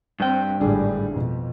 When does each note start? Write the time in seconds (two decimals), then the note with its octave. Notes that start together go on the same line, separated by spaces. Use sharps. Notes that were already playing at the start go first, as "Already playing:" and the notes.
0.20 G2 C4 G5
0.60 G#1 A2 D3 G3 D4 G#4
1.10 F2 B2